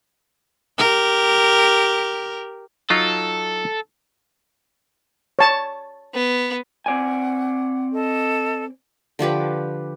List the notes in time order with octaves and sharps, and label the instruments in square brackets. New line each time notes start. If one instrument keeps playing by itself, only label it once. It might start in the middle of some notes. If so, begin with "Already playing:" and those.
[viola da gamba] G4 A#4
[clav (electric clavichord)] F#3 D#4 F4 [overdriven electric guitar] A4
[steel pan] C#5 A5
[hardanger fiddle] B3
[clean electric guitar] C4 D5 G#5 [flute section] F#5
[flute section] A4 D#5
[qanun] D3 F3 G4 B4